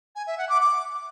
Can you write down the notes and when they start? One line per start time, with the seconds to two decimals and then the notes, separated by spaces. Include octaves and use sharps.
0.16 G#5
0.27 E5
0.38 F#5
0.49 D6
0.60 D6